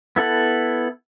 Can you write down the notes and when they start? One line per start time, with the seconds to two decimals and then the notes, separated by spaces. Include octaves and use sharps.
0.16 B3 E4 A4 F#5